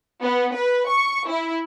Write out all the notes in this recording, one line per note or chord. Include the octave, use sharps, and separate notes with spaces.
B3
B4
C#6
E4